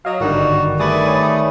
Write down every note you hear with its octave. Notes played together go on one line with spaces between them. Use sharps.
F#3 D#5 F5
G#1 D2 G2 D3 D#3 G3 F#4
G3 A3 G#4 B4 D5
C#5 D#6